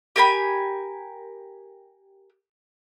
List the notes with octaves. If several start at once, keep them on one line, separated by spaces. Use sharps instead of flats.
G4 A#4 G#5 B5